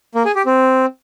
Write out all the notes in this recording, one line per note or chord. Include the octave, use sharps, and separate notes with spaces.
A#3
G#4
G4
C4